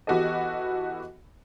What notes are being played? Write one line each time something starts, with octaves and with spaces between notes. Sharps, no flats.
E3 B3 F#4 G4 A4 D#5